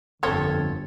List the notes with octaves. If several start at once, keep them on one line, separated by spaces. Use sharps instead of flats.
G1 F2 D3 F3 A#3 C4 A4 C#5